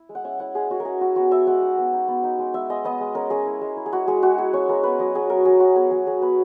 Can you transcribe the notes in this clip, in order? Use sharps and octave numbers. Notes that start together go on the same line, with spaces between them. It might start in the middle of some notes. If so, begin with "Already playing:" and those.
Already playing: E4
G#3
F#5
C#4 E5
E4 F#5
G#3 G#4
C#4 F#4
A#4
C#4 G#4
E4 F#4
B3 F#4
B3 E5
G#3 F#5
D#4
B3
D#4
B3
D#4
G#3
G#3 E5
G#3 D#5
B3 D#5
G#3
C#4 A#4
C#4 G#4
E4
G#3
E4
G#4
G#3 F#4
G#3 G#4
G#3 F#4
E4 G#4
C#4 C#5
G#3 A#4
B3 B4
F#3 D#5
F#3 G#4
F#3 A#4
F#3 G#4
F#3 F#4
B3 G#4
F#3 G#4
F#3 G#4
B3 B4